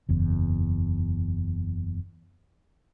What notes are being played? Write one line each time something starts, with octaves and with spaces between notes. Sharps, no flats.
F#1 E2